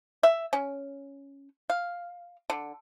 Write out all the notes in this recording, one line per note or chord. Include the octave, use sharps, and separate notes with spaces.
E5
C#4
F5
D3